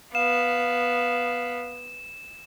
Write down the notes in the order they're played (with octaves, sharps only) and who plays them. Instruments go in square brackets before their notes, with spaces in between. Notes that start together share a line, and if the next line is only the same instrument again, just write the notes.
[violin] B3 [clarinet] F5 [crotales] E7